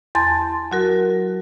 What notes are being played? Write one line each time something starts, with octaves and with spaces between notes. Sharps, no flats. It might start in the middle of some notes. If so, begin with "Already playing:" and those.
E2 A5 C6 A6
F#3 F#4 A#4